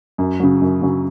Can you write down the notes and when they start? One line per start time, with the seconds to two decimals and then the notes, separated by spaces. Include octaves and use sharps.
0.18 F#2
0.40 C#3 F#3
0.62 F#2
0.82 C#3 F#3